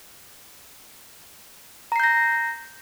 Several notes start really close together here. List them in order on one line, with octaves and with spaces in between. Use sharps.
A#5 C7 G6 A#6